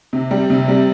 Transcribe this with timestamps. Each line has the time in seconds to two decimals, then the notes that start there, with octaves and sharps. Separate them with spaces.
0.13 C3
0.31 G3
0.50 C3
0.68 G3